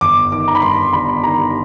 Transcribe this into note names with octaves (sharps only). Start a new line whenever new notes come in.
G1 D6
D#3 D6
A#5
B5
G2 C6
G1 B5
D#3 A#5